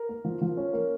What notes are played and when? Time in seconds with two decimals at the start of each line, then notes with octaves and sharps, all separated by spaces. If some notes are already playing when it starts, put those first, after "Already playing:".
Already playing: A#4
0.09 A#3
0.25 F3
0.42 F3
0.57 C#4
0.73 A#3